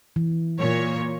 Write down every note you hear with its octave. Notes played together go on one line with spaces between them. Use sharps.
E3
A#2 C#5